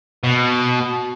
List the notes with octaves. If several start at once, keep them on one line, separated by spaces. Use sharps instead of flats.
B2